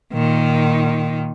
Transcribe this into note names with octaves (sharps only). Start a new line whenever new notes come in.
A#2 D#3